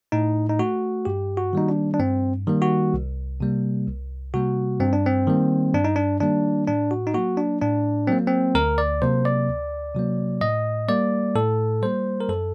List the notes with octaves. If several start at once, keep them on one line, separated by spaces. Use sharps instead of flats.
A2 D#4
D#4
A3 F#4
G2 G4
F#4
D#3 G3 A#3 D#4
D4
D4
G2 C4
D#3 G3 A#3
F#4
C2
C3 G3 A#3
C2
C3 G3 A#3 F#4
G2 C4
D4
C4
D#3 G3 A#3
G2 D4
D#4
D4
D#3 G3 A#3 D4
A2 D4
F#4
D#4
F#3 A#3 F#4
D4
A2 D4
F#3 A#3 C4
C4
D2 A#4
D5
C3 F#3 A#3 C5
D5
D2
C3 F#3 A#3
A2 D#5
G3 A#3 D5
A2 A4
G3 A#3 C5
A#4
F#2 A4